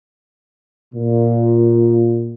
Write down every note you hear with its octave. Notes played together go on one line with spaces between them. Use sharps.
A#2